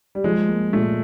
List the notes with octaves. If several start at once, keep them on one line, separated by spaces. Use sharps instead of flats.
G3
F3 G#3
A#3
A#2 A3